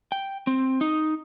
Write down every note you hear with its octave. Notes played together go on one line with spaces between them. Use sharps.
G5
C4
D#4